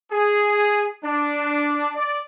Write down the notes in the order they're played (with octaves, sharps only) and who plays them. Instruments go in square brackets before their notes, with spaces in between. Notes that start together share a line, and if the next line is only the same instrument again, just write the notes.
[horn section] G#4
D4
D5